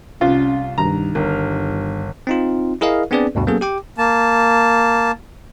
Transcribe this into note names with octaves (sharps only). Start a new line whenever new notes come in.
C2 C#4 F4
G2 D#3 A#5
G1 G2 A#4
C4 D#4 F4
E4 G#4 A#4 D#5 F5
B3 C4 D4 G#4 B4 D5
D2 G2 B2
F#3 A#3 B3 C#4 G#4 A4
G4 G5 D6
A#3 A5